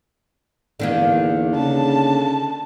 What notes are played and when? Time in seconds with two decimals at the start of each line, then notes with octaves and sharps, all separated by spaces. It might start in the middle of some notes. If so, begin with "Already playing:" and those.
0.80 E2 D3 D#3 A#3
1.55 C#3 A5